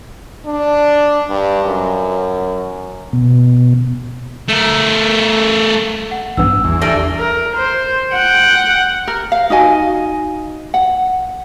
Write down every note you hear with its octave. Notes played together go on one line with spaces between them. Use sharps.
D4
G2
F#2
B2
A3 A#4
F#5
A1 G2 B3 E6
E2
G3 A3 D4 A#6
A#4
C5
F#5 G5
A#4
F5
D#4 F#4 D#5 G#5
F#5